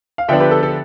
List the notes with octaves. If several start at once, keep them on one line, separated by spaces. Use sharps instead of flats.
F5
D3 F3 B3 D4 E5 G5
G4 B4
A4
A4